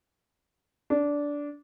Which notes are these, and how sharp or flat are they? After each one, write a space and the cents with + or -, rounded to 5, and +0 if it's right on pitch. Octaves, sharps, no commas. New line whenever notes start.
D4 -15